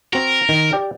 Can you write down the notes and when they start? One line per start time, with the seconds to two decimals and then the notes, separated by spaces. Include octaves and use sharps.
0.13 C4 F#4 A#4
0.49 D#3
0.73 G4 D5 G5